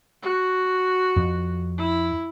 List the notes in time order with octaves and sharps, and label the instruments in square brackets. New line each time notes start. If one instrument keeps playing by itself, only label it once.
[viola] F#4
[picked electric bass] F2
[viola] E4